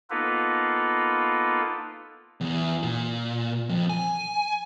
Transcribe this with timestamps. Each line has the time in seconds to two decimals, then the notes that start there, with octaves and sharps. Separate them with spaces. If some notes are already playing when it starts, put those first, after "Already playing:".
0.10 A#3 B3 D#4 F4 A4 B4
2.41 E2
2.83 A#2
3.69 F2
3.90 G#5